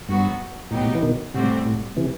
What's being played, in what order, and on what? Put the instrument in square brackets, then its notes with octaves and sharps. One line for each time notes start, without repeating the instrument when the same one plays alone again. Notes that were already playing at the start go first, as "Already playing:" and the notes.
[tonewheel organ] G2 [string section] F#3 B3 F#4
[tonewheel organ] A2 [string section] F#3 B3 D#4 G4
[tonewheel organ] A2
B2
E3
B2 D#3
[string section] A2 G3 C4 F#4 [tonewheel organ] C3
[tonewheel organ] A2
C3 E3